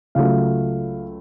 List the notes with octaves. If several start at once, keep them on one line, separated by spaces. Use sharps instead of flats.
C#2 C#3 F#3 A3 F5